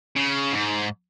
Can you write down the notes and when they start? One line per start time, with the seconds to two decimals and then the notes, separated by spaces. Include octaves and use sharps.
0.16 C#3
0.52 G#2